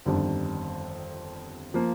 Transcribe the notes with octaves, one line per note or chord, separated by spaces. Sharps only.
G1 F2 D#3 G3 D4
F3 A#3